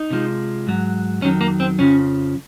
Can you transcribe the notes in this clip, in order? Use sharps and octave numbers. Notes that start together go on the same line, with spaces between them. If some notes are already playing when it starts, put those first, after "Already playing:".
Already playing: D#4
C3 F3 G#3
G#2 F#3
F2 D#3 F#3 C#4
A#3
C4
F2 C#3 F3 C#4